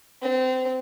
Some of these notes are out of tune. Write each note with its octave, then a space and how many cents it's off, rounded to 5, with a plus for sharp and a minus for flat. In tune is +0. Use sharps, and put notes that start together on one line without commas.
C4 -25